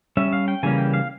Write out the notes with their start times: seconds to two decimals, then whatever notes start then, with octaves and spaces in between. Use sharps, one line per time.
0.17 G3 C#4 E5
0.33 F5
0.48 G5
0.63 C#3 E3 G3 A#3 C#4 G#5
0.78 G5
0.94 F5